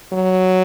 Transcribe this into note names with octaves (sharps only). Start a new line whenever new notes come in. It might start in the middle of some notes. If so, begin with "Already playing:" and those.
F#3